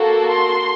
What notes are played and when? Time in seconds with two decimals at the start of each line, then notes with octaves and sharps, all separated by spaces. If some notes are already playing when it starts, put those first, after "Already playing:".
Already playing: A#3 F#4 A4
0.27 C6